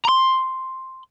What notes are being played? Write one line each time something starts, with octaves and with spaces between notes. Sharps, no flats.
A#5 C6